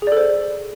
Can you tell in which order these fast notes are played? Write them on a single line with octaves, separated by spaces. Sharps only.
G#4 D5 A4 C5